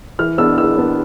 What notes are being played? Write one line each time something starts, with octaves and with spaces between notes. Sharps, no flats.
E3 F6
B3 D4 E6
E3 E6
B3 D4